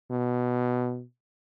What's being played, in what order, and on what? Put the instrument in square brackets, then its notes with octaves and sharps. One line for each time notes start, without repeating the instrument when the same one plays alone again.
[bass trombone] B2